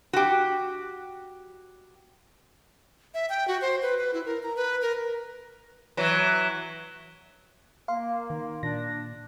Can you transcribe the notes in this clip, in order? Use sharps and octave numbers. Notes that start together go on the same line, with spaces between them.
F#4 G4
E5
G5
F#4
C5
B4
B4
E4
A#4
A#5
B4
A#4
E3 F#3
A#3 F5 C6
D#3
A#2 D4 A#6